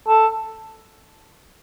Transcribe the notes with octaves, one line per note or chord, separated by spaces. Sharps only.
A4